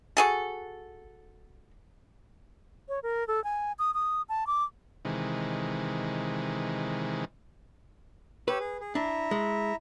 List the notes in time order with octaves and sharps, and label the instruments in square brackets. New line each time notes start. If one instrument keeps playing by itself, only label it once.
[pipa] F#4 G#4 A4
[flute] C#5
A#4
A4
G#5
D#6
D#6
A5
D6
[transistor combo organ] C3 D#3 E3 G#3
[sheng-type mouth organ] G4 C#5 E6 [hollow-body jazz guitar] B4
[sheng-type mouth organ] G#4
G#4
[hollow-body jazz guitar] D4 [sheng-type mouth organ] E4 E5 A#5
[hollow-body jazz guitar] G#3